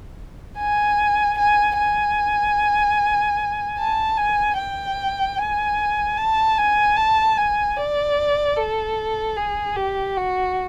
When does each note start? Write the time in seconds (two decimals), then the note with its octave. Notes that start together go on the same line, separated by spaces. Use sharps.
0.58 G#5
1.38 G#5
1.78 G#5
3.78 A5
4.17 G#5
4.57 G5
5.38 G#5
6.17 A5
6.58 G#5
6.96 A5
7.37 G#5
7.77 D5
8.57 A4
9.36 G#4
9.76 G4
10.17 F#4